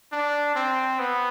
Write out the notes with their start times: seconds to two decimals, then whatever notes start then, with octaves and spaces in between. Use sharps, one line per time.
0.12 D4
0.55 C4
0.99 B3